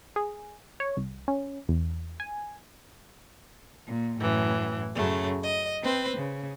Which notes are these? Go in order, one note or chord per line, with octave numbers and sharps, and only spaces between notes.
G#4
C#5
C2
C#4
E2
G#5
A#2
F#2 A2 E3
F#2 C#3 A3
D#5
C4 B4 C5
C#3